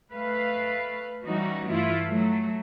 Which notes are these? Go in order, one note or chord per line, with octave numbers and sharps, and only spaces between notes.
A3 B4 F5
E3 G3 C#4 D#4 F#4
G2 E3 A3 E4 F4
F#3 A3